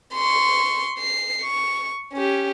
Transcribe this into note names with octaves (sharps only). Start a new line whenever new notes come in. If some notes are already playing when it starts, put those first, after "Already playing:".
C6 C#6
C7
C#6
C#4 G4